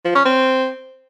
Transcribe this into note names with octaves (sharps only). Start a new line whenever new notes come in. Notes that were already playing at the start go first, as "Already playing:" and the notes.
F3
C#4
C4